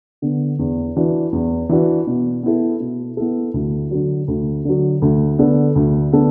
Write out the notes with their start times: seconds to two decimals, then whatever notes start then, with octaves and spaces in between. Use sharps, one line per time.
0.22 D3 B3
0.59 E2
0.96 E3 D4 F#4
1.32 E2
1.69 E3 D4 F#4
2.07 B2
2.43 B3 E4 A4
2.80 B2
3.17 B3 E4 A4
3.54 D2
3.91 D3 F#3
4.28 D2
4.65 D3 F#3
5.02 D2
5.39 D3 B3 D4 A4
5.75 D2
6.12 D3 B3 D4 A4